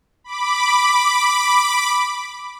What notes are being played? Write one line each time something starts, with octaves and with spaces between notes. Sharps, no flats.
B5 D6